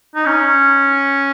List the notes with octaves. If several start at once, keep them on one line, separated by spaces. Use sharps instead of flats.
D#4
C#4